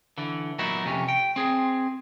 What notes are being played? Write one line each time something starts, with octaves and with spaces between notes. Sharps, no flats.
D3 E3
A#2 F#3 B3 D#4 E4
F2 C3 C#4
G5
C4 G#4